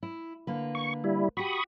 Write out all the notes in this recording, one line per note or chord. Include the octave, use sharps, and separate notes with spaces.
E4
D3 A#3 B4
C#6
G3 E4
F#4 G4 B5 C#6 D#6